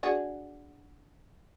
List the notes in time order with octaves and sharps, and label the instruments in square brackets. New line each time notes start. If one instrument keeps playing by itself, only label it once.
[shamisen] D4 F#4 G#4